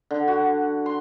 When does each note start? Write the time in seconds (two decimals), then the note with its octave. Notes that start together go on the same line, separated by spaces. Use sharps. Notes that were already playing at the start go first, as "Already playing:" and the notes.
0.11 D3
0.28 F#4
0.86 C6